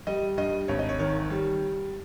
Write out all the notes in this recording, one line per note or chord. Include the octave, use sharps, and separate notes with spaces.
G3 D#5
G2 D#5
G#1 C#5
D#5
C#5
D#3 C#5
G3